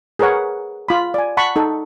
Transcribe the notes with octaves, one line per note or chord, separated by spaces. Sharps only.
G#4 A#4 B4 C#5 F#5
F4 B5
D5 G#5
F#5 A5 B5 C#6
D#4 A4